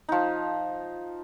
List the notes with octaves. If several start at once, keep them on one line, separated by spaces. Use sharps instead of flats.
F3 D#4